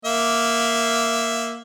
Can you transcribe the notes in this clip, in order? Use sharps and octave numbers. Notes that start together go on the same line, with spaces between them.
A#3 E5